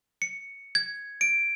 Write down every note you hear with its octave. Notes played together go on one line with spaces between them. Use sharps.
C#7
G#6
D7